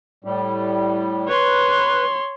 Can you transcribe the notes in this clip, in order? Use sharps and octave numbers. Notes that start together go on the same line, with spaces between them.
A2 G3
B4 C#5 C6